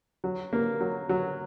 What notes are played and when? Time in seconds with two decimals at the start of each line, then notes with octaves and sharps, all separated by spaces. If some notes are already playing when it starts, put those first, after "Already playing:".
0.24 F#3
0.53 A#3
0.80 F#3
1.09 F#3